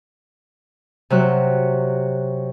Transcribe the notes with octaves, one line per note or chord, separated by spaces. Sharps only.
C3 F#3 F#6